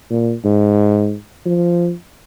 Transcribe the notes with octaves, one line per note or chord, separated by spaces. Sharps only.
A#2
G#2
F3